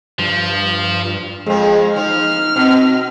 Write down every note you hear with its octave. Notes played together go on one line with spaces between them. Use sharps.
G2 F3
F2 F3 G#3
F3 D#4 F6
B2 C4